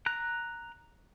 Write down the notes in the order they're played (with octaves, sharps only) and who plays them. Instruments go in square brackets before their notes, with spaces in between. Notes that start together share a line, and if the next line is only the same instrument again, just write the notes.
[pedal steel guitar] A#5 F#6